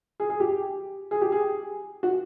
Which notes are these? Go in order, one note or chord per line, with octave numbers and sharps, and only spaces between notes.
G#4
G#4
G4
G#4
G4
G#4
F#4